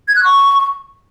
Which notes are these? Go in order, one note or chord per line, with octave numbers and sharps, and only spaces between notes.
G#6
F#6
C#6